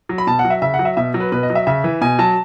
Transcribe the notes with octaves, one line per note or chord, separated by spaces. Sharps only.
F#3
B5
B2 A5
F#5
F#3
E5
C#3 E5
F#5
F#3
E5
B2 E5
F#3
B4
B2 B4
D#5
F#3
E5
C#3 E5
E3
B2 G#5
F#3 A5